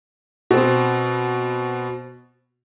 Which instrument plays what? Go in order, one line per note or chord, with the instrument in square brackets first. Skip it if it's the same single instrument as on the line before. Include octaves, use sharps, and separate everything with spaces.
[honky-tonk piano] B2 C4